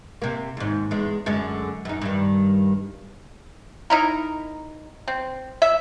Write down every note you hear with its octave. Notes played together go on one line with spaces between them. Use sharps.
C3 A#3
D#2 G#2
E2 G#3
F#2 D3 G#3
F#2 D#4
G2 D#3
D#4 E4 A#4
C4
E5